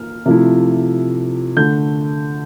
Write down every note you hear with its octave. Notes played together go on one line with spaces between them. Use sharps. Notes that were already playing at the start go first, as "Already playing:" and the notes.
Already playing: A#3 F6
C3 F3 A3 E4
D3 A3 G6